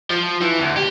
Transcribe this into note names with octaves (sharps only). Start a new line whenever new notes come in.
F3
E3
D2
G4